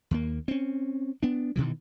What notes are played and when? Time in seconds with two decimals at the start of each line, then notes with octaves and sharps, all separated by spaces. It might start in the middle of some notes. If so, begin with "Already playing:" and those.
0.11 D#2 A#3
0.48 C4 C#4
1.23 B3 D4
1.56 G2 B2 D#3 E3